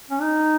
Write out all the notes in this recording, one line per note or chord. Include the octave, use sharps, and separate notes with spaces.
C#4
D#4